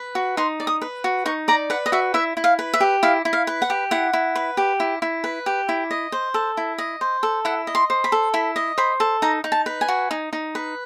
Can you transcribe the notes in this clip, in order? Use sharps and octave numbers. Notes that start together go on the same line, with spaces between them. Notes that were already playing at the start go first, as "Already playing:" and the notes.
Already playing: B4
F#4
D#4 C6
D5
D#6
B4
F#4
D#4 C#6
D5 A#5
B4 F#5
D#5
F#4 E5
E4 E5
E4
F5
B4
E5
G4
E4 F5
E4
F5
B4
F#5
G4
E4 F#5
E4
B4
G4
E4
E4
B4
G4
E4
D#5
C5
A4
E4
D#5
C5
A4
E4 F#5
D#5
C6
C5
B5
A4
E4 B5
D#5
C5 B5
A4
D#4 A#5
D#4
A5
B4
G#5
F#4
D#4
D#4
B4